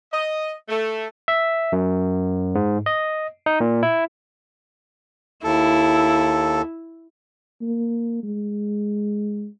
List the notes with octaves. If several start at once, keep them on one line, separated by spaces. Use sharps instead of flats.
D#5
A3
E5
F#2
G#2
D#5
D#4
A#2
E4
D#2 E4 A4
A#3
G#3